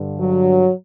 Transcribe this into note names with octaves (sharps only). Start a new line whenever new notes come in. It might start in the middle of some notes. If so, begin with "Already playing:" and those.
Already playing: G2 D3
F#3